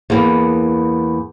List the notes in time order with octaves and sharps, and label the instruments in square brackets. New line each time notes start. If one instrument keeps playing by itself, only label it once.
[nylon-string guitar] E2 A#3 B3